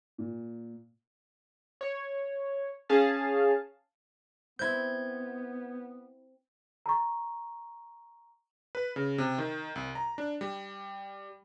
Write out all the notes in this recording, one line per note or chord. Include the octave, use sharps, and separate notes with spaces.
A#2
C#5
C#4 G#4 F5 A5
B3 C4 E4 G6 G#6
A#5 C#6
B4
C#3
C3
D#3
C2
A#5
D4
G3